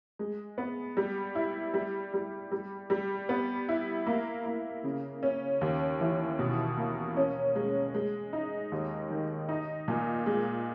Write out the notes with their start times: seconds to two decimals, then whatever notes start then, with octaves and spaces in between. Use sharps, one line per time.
0.19 G#3
0.58 B3
0.97 G3
1.35 E4
1.74 G3
2.14 G3
2.52 G3
2.90 G3
3.29 B3
3.69 E4
4.07 A#3
4.46 A#3
4.84 C#3
5.23 C#4
5.61 D#2
6.01 E3
6.39 B2
6.77 A#3
7.17 C#4
7.56 G#3
7.94 G#3
8.33 D#4
8.72 D#2
9.10 D#3
9.49 D#4
9.88 A#2
10.26 G#3